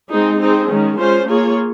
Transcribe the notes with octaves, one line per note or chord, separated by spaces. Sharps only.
G#3 C4 D#4 G#4
C4 D#4 G#4
D#3 G#3 C#4
G#3 C#4 F4 C5
A#3 F4 G#4 C#5